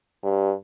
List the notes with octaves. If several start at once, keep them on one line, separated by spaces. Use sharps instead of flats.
G2